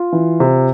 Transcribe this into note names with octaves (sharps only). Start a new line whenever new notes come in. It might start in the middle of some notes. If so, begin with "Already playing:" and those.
Already playing: F4
E3
C3